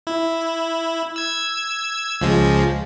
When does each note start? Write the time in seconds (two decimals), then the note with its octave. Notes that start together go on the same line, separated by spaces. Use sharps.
0.07 E4
1.16 E6 G#6
2.21 C#2 F3 G#3